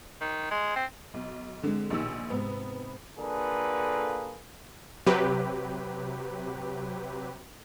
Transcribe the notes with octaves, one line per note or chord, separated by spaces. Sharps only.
D#3
G#3
C4
B1
D3 G#3 C4
A#1 B2 D#3 D#4 G4 E6
G#2 C3 B3
D3 A#3 F4 G#4 A4 B4
C3 F#3 G4 B4